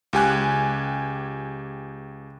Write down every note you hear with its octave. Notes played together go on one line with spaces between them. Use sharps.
C#2 G4 G#5 F#6